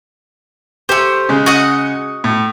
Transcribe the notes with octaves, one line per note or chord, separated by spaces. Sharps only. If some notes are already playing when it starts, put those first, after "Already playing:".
A3 G4 C5
C#3 G#3
F#4 D#5 F#5
A2